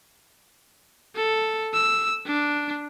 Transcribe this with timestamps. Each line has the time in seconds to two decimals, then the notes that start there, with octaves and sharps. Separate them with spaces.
1.16 A4
1.74 E6
2.26 D4